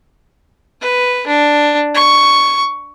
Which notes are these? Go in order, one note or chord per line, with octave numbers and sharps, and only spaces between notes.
B4
D4
C#6